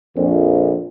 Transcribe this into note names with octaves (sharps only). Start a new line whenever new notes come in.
A#1 F2